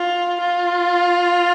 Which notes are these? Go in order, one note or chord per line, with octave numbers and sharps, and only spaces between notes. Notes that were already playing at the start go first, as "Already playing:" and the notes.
Already playing: F4
F4